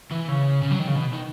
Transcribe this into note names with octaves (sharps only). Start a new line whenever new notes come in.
E3
C#3
C#3
F#3
D#3
C#3
B2
D#3